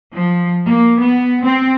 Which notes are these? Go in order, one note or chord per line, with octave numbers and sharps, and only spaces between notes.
F3
A#3
B3
C4